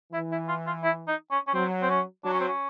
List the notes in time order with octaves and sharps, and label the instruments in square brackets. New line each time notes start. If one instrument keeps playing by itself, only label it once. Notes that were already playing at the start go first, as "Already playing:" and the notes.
[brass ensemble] E3 [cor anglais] E4
[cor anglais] E4
F4
F4
E4
D#4
C#4
C#4
[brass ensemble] F#3 [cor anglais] C4
[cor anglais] C4
C#4
[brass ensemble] F#3 [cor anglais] D4
[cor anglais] C#4
C4
C#4